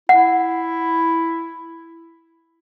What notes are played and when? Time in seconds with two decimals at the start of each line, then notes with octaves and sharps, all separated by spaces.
0.09 E4 F#5